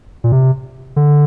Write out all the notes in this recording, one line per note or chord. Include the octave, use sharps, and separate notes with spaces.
A#2
C3
D3